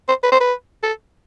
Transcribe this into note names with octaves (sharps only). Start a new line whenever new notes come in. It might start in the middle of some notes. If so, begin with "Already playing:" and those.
C5
B4
C5
B4
A4